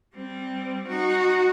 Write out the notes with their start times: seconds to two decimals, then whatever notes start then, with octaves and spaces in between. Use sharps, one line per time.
0.14 G3 C4
0.88 D#4 F#4